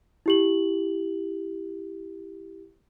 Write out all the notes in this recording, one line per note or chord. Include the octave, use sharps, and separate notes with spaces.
E4 G4 F#7